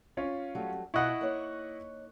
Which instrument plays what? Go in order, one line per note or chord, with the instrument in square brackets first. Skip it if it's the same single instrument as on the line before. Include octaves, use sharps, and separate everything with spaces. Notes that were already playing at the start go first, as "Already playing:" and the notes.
[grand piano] C#4 F4 C#5
[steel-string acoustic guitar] F#3 G3 A3
[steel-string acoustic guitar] B2 F4 [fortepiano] E4 D#5 F#5 [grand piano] C#6 F#6
[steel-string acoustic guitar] A#3 D#4 C#5